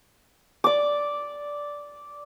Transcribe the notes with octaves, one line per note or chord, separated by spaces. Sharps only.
D5 D6